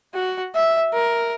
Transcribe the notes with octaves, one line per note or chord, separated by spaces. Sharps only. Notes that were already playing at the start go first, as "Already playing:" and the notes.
F#4
E5
A#4